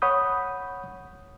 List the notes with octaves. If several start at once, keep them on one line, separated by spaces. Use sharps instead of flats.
C#5 F#5 B5 D#6 G6